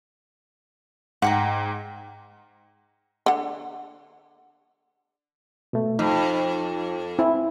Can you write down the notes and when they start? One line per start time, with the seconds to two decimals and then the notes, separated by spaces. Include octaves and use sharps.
1.22 G#2 F#5 G5 A#5
3.26 D3 F#5
5.73 B2 A3
5.99 F2 D#4
7.19 C4 E4